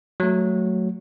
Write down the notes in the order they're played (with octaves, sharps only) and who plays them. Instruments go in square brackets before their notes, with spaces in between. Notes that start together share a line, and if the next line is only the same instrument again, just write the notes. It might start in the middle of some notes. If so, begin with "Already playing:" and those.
[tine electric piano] F#3 A3